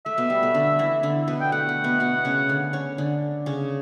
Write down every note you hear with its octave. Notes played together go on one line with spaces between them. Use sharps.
A3 E5
B2 B3
G3
A3
D3 D4
E3 E4
D3 D4
B2 B3
G5
A3 F#5
A3
B2 B3
B2 B3
C#3 C#4
D3 D4
C#4 C#5
D3 D4
C#3 C#4